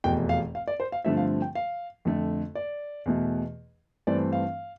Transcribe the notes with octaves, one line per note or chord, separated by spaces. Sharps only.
F1 E2 B2 G5
F5
F5
D5
C5
F5
G2 D3 F3 A3 C4 E5
F5
G5
F5
F2 D3 A3
D5
E2 B2 A3
G2 E3 A3 C4 D5
F5